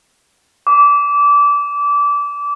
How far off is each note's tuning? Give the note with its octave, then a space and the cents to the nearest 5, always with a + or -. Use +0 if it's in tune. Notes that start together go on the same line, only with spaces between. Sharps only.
D6 -25